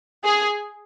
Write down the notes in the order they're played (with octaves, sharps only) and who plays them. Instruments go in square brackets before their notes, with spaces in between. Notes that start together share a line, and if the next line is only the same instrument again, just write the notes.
[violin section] G#4